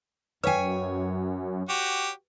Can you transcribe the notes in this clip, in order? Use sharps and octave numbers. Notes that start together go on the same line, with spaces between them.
F#2 B4 C#5 F5 G5 G#5
F#4 G4